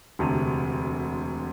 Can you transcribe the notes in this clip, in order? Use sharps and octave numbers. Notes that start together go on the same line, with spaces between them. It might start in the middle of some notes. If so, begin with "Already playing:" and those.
E1 D2 C3